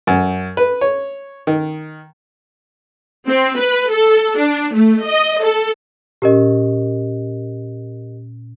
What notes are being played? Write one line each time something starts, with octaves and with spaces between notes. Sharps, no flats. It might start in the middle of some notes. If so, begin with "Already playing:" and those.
F#2
B4
C#5
D#3
C4
B4
A4
D4
A3
D#5
A4
A#2 C#4 G4 A#4 D#5